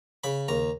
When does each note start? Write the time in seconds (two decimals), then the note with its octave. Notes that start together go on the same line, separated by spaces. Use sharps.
0.24 C#3 B5
0.48 D#2 A#5